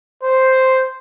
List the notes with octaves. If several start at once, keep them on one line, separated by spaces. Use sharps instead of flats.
C5